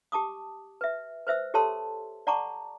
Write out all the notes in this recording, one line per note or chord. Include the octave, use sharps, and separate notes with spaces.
G4 A5 D6 D#6
B4 E5
B4 C5 E5 E6
G4 A4 C#5 A5 C6 E6
D5 F#5 A5 A#5 C#6 D6